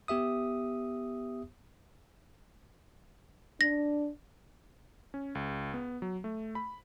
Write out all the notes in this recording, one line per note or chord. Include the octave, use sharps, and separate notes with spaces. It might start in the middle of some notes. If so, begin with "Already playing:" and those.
B3 G4 E5 D#6
D4 A#6
C#4
C#2
B3
F#3
A3
B5